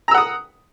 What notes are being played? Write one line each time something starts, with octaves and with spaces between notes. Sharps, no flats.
F#5 A#5 D#6 E6